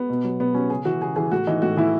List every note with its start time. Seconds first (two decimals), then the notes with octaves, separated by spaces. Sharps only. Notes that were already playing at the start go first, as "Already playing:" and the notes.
Already playing: B3
0.10 B2
0.24 F#3
0.40 B2 B3
0.54 F#3 C#4
0.70 C#3 G#4
0.85 E3 F#4
1.01 C#3 G#4
1.16 E3 G#4
1.31 A2 F#4
1.47 E3 D#4
1.62 A2 F#4
1.77 E3 E4